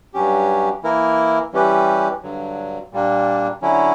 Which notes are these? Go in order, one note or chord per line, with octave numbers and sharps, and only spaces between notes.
G2 F#3 C#4 G4
E3 A#3 E4 A#4
E3 G3 C#4 G4 B4
G2 D3 F#3
A#2 G3 A#3 D4
D3 F#3 C#4 E4